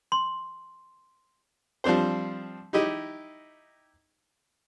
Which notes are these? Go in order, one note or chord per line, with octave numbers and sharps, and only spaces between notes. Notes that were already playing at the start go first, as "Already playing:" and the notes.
C6
F3 G3 C4 D4 C5
D#4 E4 G4 D#5